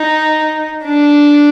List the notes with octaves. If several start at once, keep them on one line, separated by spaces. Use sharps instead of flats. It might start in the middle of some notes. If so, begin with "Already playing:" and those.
Already playing: D#4
D4